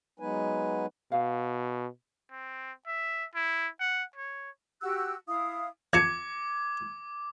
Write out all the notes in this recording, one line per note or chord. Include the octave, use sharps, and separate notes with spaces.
F#3 G#3 B3 D#4 B4 G#5
B2 F5
C4
E5
E4
F#5
C#5
F#4 G4 E6 F#6
E4 F5 D#6
F2 F4 A4 D6 G#6 C#7